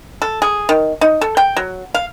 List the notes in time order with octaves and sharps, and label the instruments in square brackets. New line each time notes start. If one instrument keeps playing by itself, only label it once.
[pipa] A4
G#4
D#3
D#4
A4
G5
F#3
F5